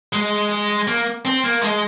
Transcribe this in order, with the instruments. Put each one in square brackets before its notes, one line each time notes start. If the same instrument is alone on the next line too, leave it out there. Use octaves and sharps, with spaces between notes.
[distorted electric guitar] G#3
A#3
C4
A#3
G#3